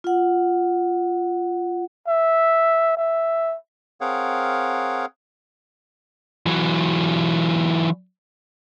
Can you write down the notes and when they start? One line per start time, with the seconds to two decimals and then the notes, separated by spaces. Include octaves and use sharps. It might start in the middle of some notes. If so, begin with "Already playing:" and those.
0.04 F4 F#5
2.08 E5
2.97 E5
4.01 C4 G#4 A#4 C#5 F5 F#5
6.47 E3 F#3